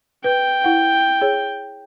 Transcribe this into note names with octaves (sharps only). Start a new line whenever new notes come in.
B4 G5
E4 F#5
G#4 C#5